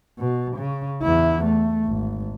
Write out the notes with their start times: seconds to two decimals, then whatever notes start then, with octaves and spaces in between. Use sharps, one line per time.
0.19 B2
0.57 C#3
1.03 E2 E4
1.45 A3
1.86 G#1